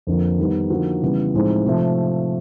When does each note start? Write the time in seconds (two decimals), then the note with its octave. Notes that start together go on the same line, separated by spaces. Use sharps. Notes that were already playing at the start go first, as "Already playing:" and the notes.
0.07 F2 D3 F3 A#3
0.39 D#3 G3 B3 D#4
0.70 D3 F3 A#3 D#4 F#4
1.02 C#3 E3 G3 B3
1.34 A2 F3 G#3 C4 D#4
1.66 C3 F3 A3